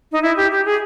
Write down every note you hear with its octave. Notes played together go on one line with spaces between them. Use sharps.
D#4
E4
G4
G4
G#4